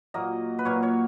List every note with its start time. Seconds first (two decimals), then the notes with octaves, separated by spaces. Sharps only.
0.14 A#2 F#3 A#3 D#5
0.59 B4
0.65 A#2 F#3 A#3 C#5
0.83 C#5